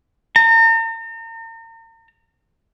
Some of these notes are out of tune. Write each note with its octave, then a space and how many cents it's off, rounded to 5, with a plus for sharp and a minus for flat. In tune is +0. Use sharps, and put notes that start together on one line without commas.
A#5 -40